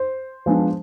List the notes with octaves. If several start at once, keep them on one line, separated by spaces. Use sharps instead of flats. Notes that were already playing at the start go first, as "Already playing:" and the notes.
Already playing: C5
F3 G#3 B3 D4